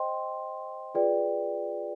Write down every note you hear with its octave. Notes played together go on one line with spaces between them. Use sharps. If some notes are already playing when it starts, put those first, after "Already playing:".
Already playing: C5 D#5 G5 C6
F4 G#4 B4 D5 G5